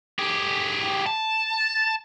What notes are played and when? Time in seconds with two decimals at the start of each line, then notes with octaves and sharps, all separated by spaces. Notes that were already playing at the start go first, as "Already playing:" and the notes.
0.19 G4 G#4
1.06 A5